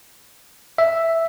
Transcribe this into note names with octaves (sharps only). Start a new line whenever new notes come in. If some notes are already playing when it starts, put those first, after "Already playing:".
E5